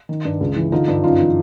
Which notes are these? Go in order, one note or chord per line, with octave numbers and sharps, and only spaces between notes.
D#3
G2
C#2
E3
D3 D#4 F4
G2
F#2 D#4 F4
E3